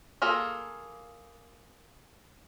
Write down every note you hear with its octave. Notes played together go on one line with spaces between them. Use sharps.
A#3 F4 G#4 A4